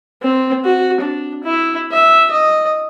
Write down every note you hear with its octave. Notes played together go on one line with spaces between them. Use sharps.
C4
F#4
D4
E4
E5
D#5